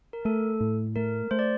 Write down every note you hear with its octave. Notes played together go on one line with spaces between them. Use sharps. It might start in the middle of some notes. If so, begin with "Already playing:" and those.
A#4
A3 A4
A2
A3 A#4
A3 C5
D5